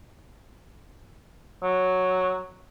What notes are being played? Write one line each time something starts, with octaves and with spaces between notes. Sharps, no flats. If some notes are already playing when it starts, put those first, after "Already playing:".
F#3